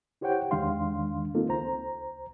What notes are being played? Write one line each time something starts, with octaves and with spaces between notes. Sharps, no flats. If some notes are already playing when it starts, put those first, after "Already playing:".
E4 G4 C5 C#5 F#5 G5
E2 D#3 G#3 D4 F5 C6
A#3 C4 D#4 F4 A4
C#2 C5 A#5